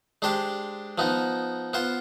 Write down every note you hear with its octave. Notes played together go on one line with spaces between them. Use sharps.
G#3 D4 G4 C5
F3 B3 D#4
B3 F4 C5